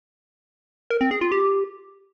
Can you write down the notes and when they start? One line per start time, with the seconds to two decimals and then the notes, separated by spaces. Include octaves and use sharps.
0.90 A#4
1.01 C4
1.11 G#4
1.21 F4
1.32 G4